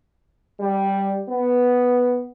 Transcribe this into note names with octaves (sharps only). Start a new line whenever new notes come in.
G3
B3